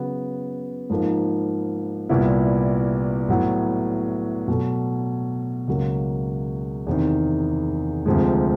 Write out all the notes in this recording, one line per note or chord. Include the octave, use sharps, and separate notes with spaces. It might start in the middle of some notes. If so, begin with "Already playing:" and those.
Already playing: C#3 F#3 B3
G#2 F3 A#3 D#4
C2 A#2 G3 B3 E4
A2 F#3 B3
B2 F#3 A3
C#2 C#3 F#3 A#3
E2 C3 D#3
D2 C3 F3 G#3